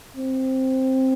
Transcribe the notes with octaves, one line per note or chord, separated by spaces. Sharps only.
C4